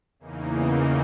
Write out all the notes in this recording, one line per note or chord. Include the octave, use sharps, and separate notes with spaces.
E2 C#3 E3 A#3 D#4